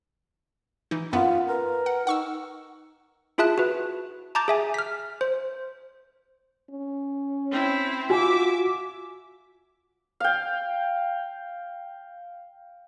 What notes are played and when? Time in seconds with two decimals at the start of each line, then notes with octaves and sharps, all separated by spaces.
0.91 E3 D#4
1.13 F#2 B3 F4 F#5
1.47 A#4 B4
1.86 F#5
2.07 D#4 F#5 C#6 E6
3.38 E4 F4 G#4 E5 A5 F#6
3.58 F#4 B4
4.35 A5 A#5 D6 G6 A6
4.48 G#4 E5 G#5
4.74 F6 B6
5.21 C5
6.70 C#4
7.51 C4 E4
8.10 F4 F#4 E5 G#5 D6
10.20 F5 G5